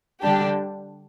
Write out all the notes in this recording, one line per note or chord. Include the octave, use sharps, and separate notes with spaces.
D3 G3 D4 G4